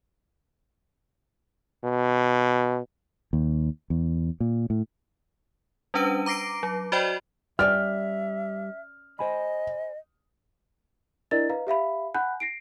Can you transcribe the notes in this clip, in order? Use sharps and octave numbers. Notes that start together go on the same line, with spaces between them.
B2
D#2
E2
A#2
A2
G3 C#4 D4 B4 D#7
A#5 D6 A#6 C7 D7
F#3
F#4 C5 D5 D#5 G5 B5
G3 C#4 D5 E5 G5 F6
C5 D#5 G#5 B5
D4 E4 A#4 D5 D#5 A6
B4 D#5 F5 A#5
G4 E5 F5 B5
F#5 G#5 B5 F#6 G6
A#6 C7 D7